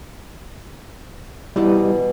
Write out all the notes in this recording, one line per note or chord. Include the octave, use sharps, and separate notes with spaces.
B2 E3 G3 E4 D#5